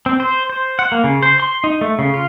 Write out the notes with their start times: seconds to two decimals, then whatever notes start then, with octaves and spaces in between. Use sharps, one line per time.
0.06 C4
0.20 C5
0.50 C5
0.79 F#5
0.92 A#3
1.04 C#3
1.23 C5
1.40 C6
1.64 D#4
1.81 A3
1.99 C#3
2.14 F4